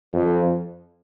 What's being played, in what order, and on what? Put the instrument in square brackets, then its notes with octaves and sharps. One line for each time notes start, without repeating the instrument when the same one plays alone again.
[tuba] F2